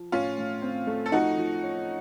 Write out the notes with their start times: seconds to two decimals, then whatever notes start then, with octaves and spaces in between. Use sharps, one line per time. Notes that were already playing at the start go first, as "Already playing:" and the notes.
Already playing: F3
0.12 A2 C#4 F4
0.38 A2
0.62 C4
0.87 A3
1.06 A4
1.12 F3 D#4 F#4
1.37 F3
1.63 C#4